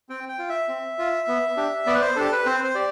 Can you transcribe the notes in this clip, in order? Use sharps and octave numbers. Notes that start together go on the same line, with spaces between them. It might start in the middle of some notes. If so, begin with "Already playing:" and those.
C4 G5
G5
F4
E5
C4
F4
B3
D4 G4
B3 D5
B4
C5
D4 G4 A4
B4
C4 C5
C5
G4 D5